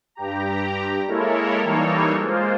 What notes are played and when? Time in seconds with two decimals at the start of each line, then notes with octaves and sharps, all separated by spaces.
0.15 G2 G4 A#5
1.07 G#3 A#3 E4 A4 A#4 C#5
1.63 E3 G3 A#3 D#4 A4 C#5
2.20 G#3 A#3 F4 C5